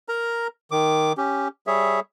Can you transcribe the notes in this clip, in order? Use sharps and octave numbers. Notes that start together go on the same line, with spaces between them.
A#4 A#5
D#3 D6
C#4 G4
G3 G#4 C#5 E5